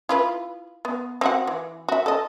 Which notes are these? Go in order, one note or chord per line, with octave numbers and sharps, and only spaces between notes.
E4 F4 B4
B3
C4 F#4 F#5
E3
F#4 E5
A4 D#5